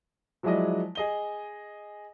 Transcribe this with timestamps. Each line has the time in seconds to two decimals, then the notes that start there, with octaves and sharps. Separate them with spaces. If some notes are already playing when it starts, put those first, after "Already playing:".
0.43 F3 F#3 G#3 E4 D5 D#5
0.95 G#4 D#5 G7